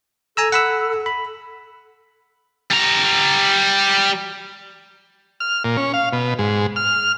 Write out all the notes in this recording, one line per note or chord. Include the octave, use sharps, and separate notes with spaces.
A4 G#5 A#5 E6
F#5 B5 E6
B5
G3 A#5
F6
A#2
C#4
F5
B2
G#2
F6